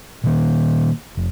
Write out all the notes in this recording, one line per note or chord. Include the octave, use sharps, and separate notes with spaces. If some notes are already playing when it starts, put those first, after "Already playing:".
A#2 D#3 A#3
F1